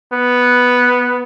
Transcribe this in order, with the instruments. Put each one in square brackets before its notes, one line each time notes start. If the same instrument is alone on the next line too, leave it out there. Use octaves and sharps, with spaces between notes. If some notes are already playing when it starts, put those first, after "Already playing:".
[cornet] B3